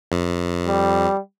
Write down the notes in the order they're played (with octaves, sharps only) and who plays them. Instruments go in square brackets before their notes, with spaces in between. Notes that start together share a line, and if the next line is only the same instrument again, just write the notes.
[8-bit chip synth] F2
[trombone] G3